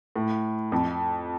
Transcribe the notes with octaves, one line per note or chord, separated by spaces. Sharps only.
A2
F2